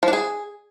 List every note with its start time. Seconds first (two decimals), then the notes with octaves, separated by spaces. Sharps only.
0.03 F3
0.08 D4
0.13 G#4